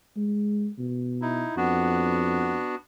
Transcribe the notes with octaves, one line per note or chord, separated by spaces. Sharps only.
G#3
B2
D#4 E4
F2 B3 D4 F#4